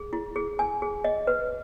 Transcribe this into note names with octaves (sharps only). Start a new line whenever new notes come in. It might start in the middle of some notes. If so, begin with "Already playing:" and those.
Already playing: G#4
E4
G#4
G#5
G#4
D#5
B4